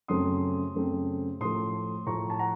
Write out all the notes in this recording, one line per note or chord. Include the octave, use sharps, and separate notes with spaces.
F#2 C#3 A3 C4 C6 D#6
F#2 C#3 A3 C4
A2 F3 A3 C6 D#6
A2 F3 A3 A#5 C#6
A5
F#5 A#5